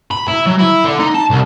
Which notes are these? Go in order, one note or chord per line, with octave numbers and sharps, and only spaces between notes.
B5
E4
F#3
E4
D3
D#4
A5
C2